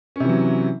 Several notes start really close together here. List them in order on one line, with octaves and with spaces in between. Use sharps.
C#4 C3 E3 F#3